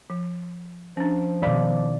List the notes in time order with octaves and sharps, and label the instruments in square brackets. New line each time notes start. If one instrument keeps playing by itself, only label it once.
[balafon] F3
[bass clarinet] F3 [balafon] C#4 D4
[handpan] B2 D5 [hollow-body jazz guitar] D#3 F5 B5